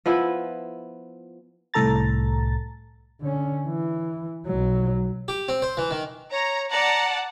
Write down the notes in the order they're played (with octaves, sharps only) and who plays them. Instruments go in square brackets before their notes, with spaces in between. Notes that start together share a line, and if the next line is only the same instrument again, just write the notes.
[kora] F3 B3 E4 B4
[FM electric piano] C2 A2 A4 A#5 A6
[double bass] D3 C#4
E3
B1 F#3
[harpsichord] G4
C4
C5
E3
D#3
[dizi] C#5 [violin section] A#5
[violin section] D5 F#5 A5 [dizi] A#5